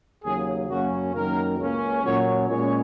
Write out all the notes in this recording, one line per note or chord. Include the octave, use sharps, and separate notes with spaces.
D#2 C#3 F#3 G#4
F#2 C#3 A#3 C#4 F#4
F#2 D#3 A#3 A#4
C#2 C#3 A#3 C#4
A#2 F#3 C#4 C#5
A#2 G#3 C#4 C#5